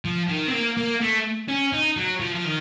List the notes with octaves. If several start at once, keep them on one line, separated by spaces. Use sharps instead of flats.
F3
D#3
C4
A#3
A#3
A3
C#4
D#4
F#3
F3
F3
D#3